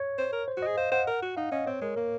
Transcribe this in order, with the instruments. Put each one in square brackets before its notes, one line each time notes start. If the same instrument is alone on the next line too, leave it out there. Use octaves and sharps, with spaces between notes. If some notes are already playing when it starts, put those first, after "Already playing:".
Already playing: [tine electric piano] C#5
[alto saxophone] C5
A#4
[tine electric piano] C5
[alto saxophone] F#4
[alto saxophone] G#4 [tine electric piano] D#5
[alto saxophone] C5 [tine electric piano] F5
[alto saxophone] C5 [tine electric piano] F#5
[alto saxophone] A#4
F#4
[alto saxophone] D#4 [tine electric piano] F5
[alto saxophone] C#4 [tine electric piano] D#5
[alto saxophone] C4 [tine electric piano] C#5
[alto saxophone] G#3 [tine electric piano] A#4
[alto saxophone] A#3 [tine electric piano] A#4